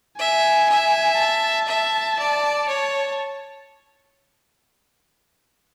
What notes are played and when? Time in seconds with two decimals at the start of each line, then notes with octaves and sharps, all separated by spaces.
0.19 E5 G#5
0.69 E5
1.19 A5
1.68 E5
2.19 D5
2.68 C#5